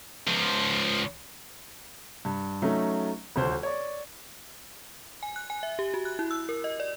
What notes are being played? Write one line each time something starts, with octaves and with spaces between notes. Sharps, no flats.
C#2 F3
G2
F#3 A3 C#4 D#4
D#1 D2 C5
C#5 D5
G#5
F#6
G#5
E5
G4
F#4
F#6
E4
E6
A#4
D#5
D5